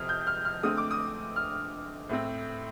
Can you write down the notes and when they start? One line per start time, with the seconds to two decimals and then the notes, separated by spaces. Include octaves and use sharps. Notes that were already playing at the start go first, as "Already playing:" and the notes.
Already playing: F2 C3 D#6 F6
0.09 G6
0.27 F6
0.45 F6
0.63 D3 A3 C4 D#6
0.77 D6
0.91 D#6
1.36 F6
2.09 A2 A3 C4